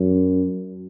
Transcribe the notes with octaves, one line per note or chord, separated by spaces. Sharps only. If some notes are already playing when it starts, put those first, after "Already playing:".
Already playing: F#2